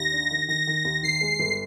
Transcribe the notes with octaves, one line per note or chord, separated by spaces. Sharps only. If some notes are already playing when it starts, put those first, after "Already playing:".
Already playing: D#2 A#6
D4
D#3
D#3 A#6
D#3
D#2
D#3 C7
G#3
G1